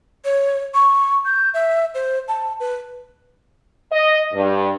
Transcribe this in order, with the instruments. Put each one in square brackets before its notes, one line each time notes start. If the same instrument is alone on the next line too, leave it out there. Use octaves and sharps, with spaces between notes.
[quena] C#5
C#6
G6
E5
C5
A5
B4
[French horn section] D#5
G2